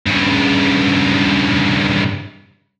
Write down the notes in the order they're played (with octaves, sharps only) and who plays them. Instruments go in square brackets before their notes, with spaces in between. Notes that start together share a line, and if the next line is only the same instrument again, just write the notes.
[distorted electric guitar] G2 C#3